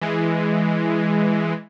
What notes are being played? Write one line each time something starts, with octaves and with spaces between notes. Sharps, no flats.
E3 G#3